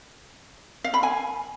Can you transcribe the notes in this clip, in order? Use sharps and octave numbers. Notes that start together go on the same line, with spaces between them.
F5
B5
G#5